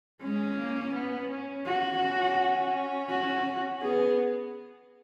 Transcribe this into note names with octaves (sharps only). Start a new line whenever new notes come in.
G#3 C#4
A#3
B3
C#4
F#4
C#4
F#4
B3 G#4